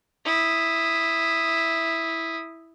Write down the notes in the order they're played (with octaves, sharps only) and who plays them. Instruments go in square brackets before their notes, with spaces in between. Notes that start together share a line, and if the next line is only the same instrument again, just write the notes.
[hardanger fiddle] E4 D#6